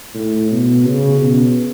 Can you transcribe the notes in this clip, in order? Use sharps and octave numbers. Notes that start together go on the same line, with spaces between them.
A2
B2
C#3
B2